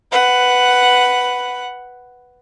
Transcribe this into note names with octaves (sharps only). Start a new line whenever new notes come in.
B4 F#5